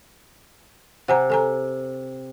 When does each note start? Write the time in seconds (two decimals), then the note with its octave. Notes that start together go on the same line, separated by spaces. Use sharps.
1.08 C3 F#5 G#5 A#5
1.30 A4 G#5 A#5